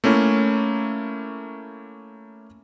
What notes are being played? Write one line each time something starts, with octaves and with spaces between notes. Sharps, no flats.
A3 A#3 C#4 E4